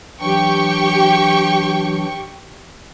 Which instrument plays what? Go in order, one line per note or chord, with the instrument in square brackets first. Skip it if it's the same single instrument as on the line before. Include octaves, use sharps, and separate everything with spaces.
[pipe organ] E3 F#3 D4 [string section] G4 G5 C#6